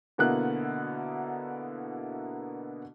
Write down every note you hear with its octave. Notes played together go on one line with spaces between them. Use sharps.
B2 D3 A#3 B3 E4 F#6